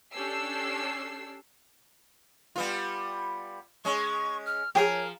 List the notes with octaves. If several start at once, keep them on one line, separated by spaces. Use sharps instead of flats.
C#4 D4 G4 A4 E6 C7
G3 B3 F4
G#3 C#4 C#6
F6
F3 G4 G#4 A#4 C#5